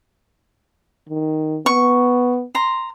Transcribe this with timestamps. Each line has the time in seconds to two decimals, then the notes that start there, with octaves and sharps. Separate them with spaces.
1.09 D#3
1.66 B3 C#6
2.55 A#5 C6